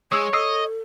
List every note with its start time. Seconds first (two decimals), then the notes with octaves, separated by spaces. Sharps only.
0.12 G#3 G#4 C#5 D#6 E6
0.33 A4 D#5 D#6 E6 C7